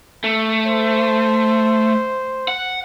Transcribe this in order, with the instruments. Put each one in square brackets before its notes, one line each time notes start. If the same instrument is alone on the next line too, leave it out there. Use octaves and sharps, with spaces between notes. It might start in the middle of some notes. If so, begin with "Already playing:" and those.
[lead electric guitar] A3
[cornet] C5
[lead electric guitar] F#5